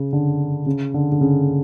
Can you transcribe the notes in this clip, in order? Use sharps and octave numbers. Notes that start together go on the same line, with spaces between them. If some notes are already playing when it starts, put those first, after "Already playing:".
Already playing: C#3
D3
C#3
D3
D3
C#3